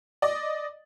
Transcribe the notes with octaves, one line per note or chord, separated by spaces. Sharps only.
D5 D#5